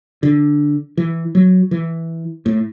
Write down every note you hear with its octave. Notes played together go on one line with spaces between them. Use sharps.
D3
E3
F#3
E3
A2